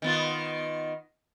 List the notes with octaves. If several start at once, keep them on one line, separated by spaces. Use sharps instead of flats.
D#3 B3 F4